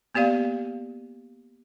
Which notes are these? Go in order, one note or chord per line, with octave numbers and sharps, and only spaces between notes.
A#3 B3 G4 D5 F5